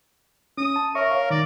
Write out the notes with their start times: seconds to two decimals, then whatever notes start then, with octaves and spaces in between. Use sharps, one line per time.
0.58 C#4 D#6
0.76 A5
0.95 A#4 C#5 E5 C#6
1.11 C#5 F5
1.30 D#3 D5